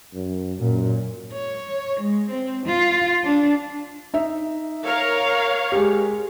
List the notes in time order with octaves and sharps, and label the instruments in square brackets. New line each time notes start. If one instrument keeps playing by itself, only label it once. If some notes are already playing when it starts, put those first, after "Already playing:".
[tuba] F#2
[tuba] F#2 [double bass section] A#2
[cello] C#5
G#3
C4
F4
D4
[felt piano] D#4 E5
[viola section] A#4 C#5 F5
[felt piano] G#3 G4